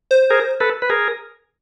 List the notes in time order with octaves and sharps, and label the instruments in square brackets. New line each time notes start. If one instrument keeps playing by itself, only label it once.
[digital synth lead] C5
[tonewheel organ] G#4 A#4
A4 B4
B4
G#4 A#4